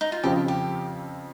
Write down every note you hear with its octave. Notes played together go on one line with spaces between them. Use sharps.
D#4
F4
F2 C#3 F3 C4 G4
G4